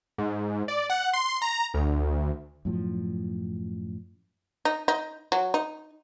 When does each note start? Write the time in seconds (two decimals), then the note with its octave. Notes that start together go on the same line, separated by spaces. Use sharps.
0.18 G#2
0.68 D5
0.90 F#5
1.13 C6
1.28 C6
1.42 A#5
1.74 D2
2.65 F#2 A2 F3
4.65 D#4
4.88 D#4
5.32 F#3
5.54 D#4